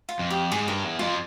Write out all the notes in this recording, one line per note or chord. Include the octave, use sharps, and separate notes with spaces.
F4
F2
G4
G#2 G#4
G2 A#4
E2
F2 F4